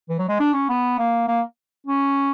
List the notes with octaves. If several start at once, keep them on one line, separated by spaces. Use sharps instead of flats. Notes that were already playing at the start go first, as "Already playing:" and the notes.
E3
F#3
G#3
D4
C#4
B3
A#3
A#3
C#4